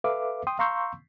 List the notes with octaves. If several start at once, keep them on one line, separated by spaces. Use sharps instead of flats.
A4 B4 E5 F5 D6
G5 C6 D#6
F5 A#5 C6 C#6 E6 G6